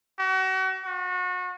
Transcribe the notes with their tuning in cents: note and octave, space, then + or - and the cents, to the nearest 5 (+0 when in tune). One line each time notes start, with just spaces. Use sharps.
F#4 +35
F#4 -30